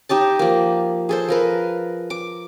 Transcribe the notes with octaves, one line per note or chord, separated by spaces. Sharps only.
D#4 G4 D#5 A5
F3 A#3
G#4 A4 C5
F3 A#4 B4
D6